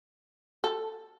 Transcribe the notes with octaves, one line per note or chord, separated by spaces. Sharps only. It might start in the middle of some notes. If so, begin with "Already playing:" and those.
A4